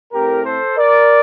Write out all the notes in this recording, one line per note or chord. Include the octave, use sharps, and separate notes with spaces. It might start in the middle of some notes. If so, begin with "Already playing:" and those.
A2 A3 C4 G4 A#4
A4 C5
A#4 D5